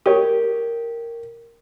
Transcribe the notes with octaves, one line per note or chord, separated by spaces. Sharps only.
G4 A#4 C#5